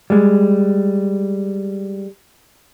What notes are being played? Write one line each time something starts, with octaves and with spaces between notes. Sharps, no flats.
G3 G#3